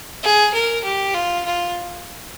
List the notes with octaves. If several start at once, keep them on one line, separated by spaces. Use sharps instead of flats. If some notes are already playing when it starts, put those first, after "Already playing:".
G#4
A#4
G4
F4
F4